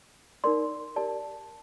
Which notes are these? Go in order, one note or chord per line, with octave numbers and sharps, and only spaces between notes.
D#4 A#4 D5 C6
G4 A#4 D5 A5